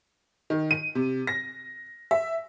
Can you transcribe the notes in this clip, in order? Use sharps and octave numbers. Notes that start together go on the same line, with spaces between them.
D#3
D#7
C3
A#6
E5